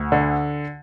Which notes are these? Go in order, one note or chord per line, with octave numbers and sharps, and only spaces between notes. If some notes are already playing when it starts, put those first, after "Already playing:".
Already playing: D2
D3